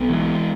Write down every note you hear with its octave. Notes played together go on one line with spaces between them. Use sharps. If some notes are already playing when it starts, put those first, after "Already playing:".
Already playing: B1 B2
E3 G#3